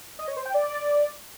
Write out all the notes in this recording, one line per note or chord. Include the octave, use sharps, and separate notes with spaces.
D#5
C#5
C5
G5
D5